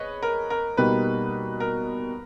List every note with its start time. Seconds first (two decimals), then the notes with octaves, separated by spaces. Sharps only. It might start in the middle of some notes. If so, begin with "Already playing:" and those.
Already playing: G#4 B4 C#5 D#5
0.23 A#4
0.50 A#4
0.77 B2 G3 A#3 D#4 B4
1.60 A#4